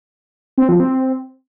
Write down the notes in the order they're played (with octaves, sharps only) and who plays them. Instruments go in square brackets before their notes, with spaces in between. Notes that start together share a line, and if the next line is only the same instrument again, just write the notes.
[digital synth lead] C4
F3
C4